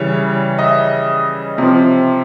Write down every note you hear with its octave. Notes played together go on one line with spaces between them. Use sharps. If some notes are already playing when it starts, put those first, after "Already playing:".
Already playing: C#3 E3 G3 C#5
D#5
E5
C3 F3